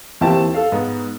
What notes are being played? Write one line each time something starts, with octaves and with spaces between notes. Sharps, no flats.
D#2 E3 C4 E4 G4 A5
A4 F5
G#2 B3